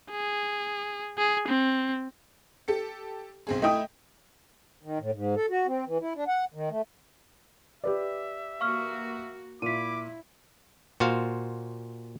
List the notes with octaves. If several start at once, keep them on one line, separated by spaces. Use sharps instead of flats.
G#4
G#4
C4
G4 A4 C#7
B1 C4 G#4
A3 E4 D#5 G5 D#6
D#3
A2
G#2
A4
F#4
C4
E3
E4
D4
F#5
D#3
A3
G4 B4 D5 E5
A#3 F#4 F5 C#6 F6
A#2 E4 D6 B6 D#7
A#2 F#4 C5 F5